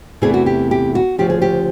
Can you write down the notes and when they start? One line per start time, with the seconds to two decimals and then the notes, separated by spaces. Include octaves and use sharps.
0.22 E2 C3 E3 A3 G#4
0.34 F#4
0.46 G4
0.71 G4
0.95 F#4
1.19 D2 C#3 F3 G4
1.30 G#4
1.42 G4